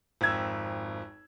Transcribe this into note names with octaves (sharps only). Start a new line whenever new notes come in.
G#1 F2 E6 G#6